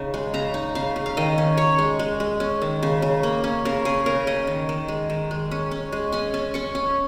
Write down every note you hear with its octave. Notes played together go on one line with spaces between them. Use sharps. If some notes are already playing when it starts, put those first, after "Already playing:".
Already playing: C#3 D#4
G#3
C#3 A#5
D#4
C#3 F5
C#3
F5
D#3 D#5
C#4
C#4 C#5
G#3
G#3
G#3
C#4
D#3
C#3
C#3
A#3
C#4
C#3 A#4
C#4 G#4
C#3 A#4
C#4 D#5
D#3
D#3
G#3
D#3
G#3
C#4
C#4
G#3
C#4 G#5
C#4
C#4 C#6
C#4